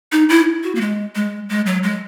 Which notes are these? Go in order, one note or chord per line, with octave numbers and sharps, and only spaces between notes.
D#4
E4
F#4
A#3
G#3
G#3
G#3
F#3
G#3